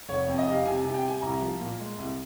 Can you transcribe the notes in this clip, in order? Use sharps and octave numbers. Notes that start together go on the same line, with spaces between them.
F1 C#5
F2
D#5
C3 F5
C3 G#5
C3 G#5
G5
C3 G#5
C2 A#5
F3
A#2
G#3
C2